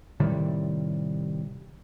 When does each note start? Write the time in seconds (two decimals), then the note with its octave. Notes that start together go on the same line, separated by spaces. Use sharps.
0.20 A2 C3 D#3 G3